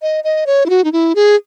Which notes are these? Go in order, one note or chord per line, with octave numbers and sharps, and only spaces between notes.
D#5
D#5
C#5
E4
F#4
D#4
E4
G#4